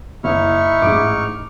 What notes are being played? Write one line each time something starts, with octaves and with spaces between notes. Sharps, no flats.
F#1 D#4 E4 C#6 F6
A1 G#2 D6